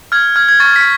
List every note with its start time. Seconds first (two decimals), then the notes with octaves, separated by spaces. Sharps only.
0.12 F6 G#6
0.36 F6 G#6
0.49 G#6
0.60 C#6 A6
0.76 B6